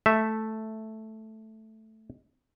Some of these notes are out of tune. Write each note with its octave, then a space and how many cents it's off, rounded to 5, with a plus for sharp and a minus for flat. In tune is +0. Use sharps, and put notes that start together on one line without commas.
A3 +0 E5 +0